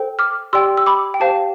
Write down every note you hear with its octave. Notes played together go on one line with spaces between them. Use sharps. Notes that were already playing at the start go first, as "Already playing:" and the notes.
Already playing: A4 C5 G5
D6 F6
G4 D5 G5 C6 E6
E6
B5 D6
G5
G4 C5 F5 A5